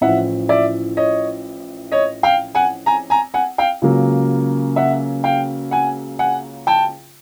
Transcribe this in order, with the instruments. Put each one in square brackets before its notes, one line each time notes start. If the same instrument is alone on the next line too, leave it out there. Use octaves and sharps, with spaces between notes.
[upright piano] A1 A2 F3 E5 F#5
D5 E5
C#5 D#5
C#5 D#5
F5 G5
F#5 G#5
G#5 A#5
G#5 A#5
F#5 G#5
F5 G5
C#2 C#3 F#3 A#3
E5 F#5
F5 G5
F#5 G#5
F#5 G#5
G5 A5